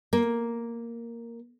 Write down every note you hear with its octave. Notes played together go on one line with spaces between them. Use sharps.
A#3